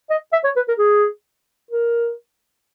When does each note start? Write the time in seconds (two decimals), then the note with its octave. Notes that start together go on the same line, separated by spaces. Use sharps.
0.10 D#5
0.32 E5
0.44 C#5
0.56 B4
0.68 A#4
0.78 G#4
1.71 A#4